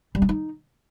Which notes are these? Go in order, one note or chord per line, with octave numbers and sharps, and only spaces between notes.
G3
C#4
D#4